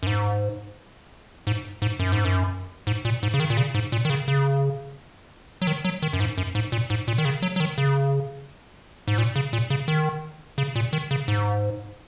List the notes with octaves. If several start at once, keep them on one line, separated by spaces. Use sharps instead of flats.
F#2
G#2
G#2
G#2
F#2
G#2
F#2
G#2
A#2
G#2
C#3
D#3
A#2
C#3
G#2
A#2
D#3
C#3
C#3
F#3
D#3
F#3
D#3
F#2
G#2
F#2
G#2
A#2
G#2
A#2
D#3
C#3
F#3
F#3
D#3
C#3
G#2
A#2
C#3
A#2
C#3
D#3
C#3
A#2
D#3
C#3
G#2